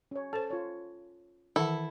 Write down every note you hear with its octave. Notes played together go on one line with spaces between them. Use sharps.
C#4 C#5
A4 C5 A5
F4 C#5
D#3 E3 E4 A4 F#5